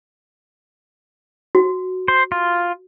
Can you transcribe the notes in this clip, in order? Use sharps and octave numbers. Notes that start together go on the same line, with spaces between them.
F#4
C5
F4